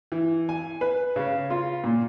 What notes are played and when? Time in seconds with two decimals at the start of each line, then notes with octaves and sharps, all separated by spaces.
0.12 E3
0.49 G#5
0.81 B4
1.16 C#3
1.50 F4
1.84 A#2